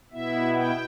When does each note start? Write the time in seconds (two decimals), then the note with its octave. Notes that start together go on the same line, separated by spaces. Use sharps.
0.12 B2 B3 E4 E5
0.55 G5